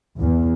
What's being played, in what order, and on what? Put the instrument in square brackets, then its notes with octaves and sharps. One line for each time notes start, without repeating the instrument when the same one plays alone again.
[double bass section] E2